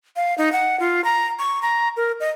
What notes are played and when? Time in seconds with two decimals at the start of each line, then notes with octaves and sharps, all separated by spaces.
0.16 F5
0.38 D#4
0.52 F#5
0.80 F4
1.04 A#5
1.39 C#6
1.62 A#5
1.97 A#4
2.20 D#5